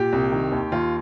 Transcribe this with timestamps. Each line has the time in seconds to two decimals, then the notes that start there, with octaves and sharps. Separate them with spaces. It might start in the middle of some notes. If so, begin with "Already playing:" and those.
Already playing: A#2 G4
0.13 C2
0.32 D#3
0.52 D#2
0.72 D#2 F4